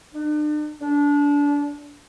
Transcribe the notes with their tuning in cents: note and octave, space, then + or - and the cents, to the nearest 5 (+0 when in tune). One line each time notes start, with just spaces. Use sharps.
D4 +40
D4 -25